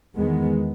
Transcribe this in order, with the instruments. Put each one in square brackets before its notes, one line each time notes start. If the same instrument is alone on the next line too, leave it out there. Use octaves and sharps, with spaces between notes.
[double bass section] E2 D#3 G#3 B3